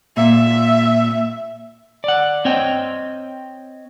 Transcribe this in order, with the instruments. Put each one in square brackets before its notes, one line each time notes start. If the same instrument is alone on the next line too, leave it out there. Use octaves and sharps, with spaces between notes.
[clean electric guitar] A#2 [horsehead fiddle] E5
[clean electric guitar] D5 F#5
C4 C#5 D#5 G5